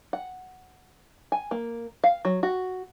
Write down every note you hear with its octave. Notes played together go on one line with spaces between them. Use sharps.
F#5
G#5
A#3
F5
F#3
F#4